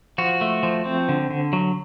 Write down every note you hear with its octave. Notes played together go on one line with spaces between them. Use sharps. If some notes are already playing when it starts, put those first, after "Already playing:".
F3 F#4
A3
F3
C4
D3
D3
F#3